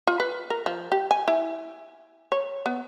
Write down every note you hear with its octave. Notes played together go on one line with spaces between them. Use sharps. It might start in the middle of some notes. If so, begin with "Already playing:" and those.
F4
B4
A#4
F3
G4
G#5
E4
C#5
B3